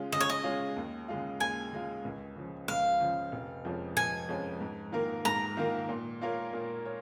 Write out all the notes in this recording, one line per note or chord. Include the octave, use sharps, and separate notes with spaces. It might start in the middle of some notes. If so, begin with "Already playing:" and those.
Already playing: C#3 G#3 C#4 F4
C#3 D#5
C#5
D#5
G#3 C#4 F4
D#2
C#3 G#3 F4
D#2 G#5
C#3 G#3 F4
C#2
C#3 F3
C#2 F5
C#3 F3
F1
F2 F3 G#3 C#4
F1 G#5
F2 F3 G#3 C#4
G#2
D#3 A#3 F4 A#4
G#2 A#5
D#3 A#3 F4 A#4
A#2
A#3 F4 A#4 C#5
A#2
C#5